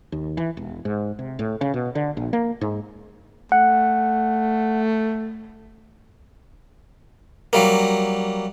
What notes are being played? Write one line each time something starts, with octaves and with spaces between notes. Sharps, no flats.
D#2
E3
E1
G#2
C3
A2
C#3
B2
D3
A#1
A#3
G#2
A3 F#5
F#3 G3 A#3